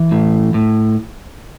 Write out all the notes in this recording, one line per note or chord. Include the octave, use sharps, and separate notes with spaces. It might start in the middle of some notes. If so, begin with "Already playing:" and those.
Already playing: E3
A2
A2